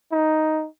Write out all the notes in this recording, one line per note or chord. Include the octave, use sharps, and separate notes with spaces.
D#4